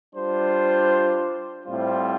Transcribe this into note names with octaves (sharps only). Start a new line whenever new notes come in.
G3 D4 F4 C5
A2 G3 C4 F4 C5